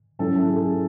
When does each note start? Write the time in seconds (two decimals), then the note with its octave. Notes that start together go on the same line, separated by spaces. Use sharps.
0.19 G#2 F#3 C#4 E4 A4
0.50 G#4